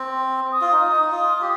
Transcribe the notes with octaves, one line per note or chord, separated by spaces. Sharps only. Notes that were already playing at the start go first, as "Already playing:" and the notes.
Already playing: C4
D#6
F4
D#4
D#4
F4
G4